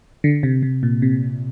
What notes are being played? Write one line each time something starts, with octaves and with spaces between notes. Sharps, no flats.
D3
C3
C3
A#2
C3